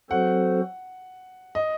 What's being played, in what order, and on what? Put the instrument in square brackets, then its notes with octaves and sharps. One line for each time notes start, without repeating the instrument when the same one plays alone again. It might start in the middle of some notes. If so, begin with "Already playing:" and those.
[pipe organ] F#3 C4 F#4 A4 C5 [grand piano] F#5
[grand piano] D#5